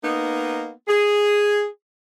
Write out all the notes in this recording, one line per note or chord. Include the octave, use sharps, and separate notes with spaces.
A#3 B3 D#4
G#4